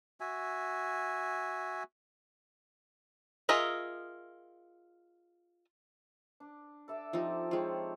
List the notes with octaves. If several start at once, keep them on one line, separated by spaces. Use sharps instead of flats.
F#4 E5 G#5
F4 G#4 A#4 D#5 E5
D4
A4 D5 E5
F3 C4 D#4 G4 A4
G#3 C4 F4 C#5